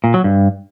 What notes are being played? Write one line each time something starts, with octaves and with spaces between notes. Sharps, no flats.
A#2
F#3
G2